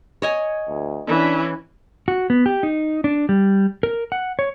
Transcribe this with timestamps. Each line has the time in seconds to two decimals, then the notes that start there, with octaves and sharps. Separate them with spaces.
0.22 C#5 D#5 G#5
0.67 D2
1.08 E3 C#4 D4
2.08 F#4
2.30 B3
2.46 G4
2.63 D#4
3.04 D4
3.29 G3
3.83 A#4
4.12 F#5
4.39 C#5